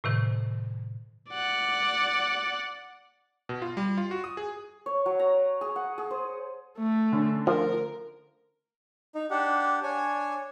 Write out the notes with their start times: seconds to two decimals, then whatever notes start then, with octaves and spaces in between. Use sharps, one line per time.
0.04 A2 C3 D#3
1.31 D5 F#5
3.49 B2
3.62 F4
3.77 G3
3.98 F4
4.11 F#4
4.24 D#6
4.37 G#4
4.86 C#5
5.06 F#3
5.19 A#5
5.61 G#4
5.76 F#5
5.98 G#4
6.11 C5
6.78 A3
7.12 D3 C#4
7.47 F3 A#4
9.15 D#4
9.30 D4 G4 F#5
9.83 D4 C#5 G#5